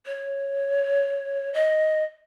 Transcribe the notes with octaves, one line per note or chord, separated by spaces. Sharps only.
C#5
D#5